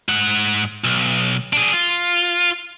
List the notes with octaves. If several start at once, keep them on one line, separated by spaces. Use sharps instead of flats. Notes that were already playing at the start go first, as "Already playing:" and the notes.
G#2 F#5
B1
D4 G#4
F4